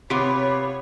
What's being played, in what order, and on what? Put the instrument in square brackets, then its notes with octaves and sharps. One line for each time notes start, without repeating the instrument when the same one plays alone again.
[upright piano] C3 [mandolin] B3 F4 [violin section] C#5 [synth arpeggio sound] B5 D6